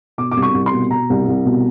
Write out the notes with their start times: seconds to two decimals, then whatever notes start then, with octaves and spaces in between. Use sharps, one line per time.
0.18 B2 D6
0.32 D6
0.37 C2
0.42 C#6
0.54 C2
0.66 C6
0.73 B2
0.90 B2 A#5
1.10 C2
1.28 C2
1.45 B2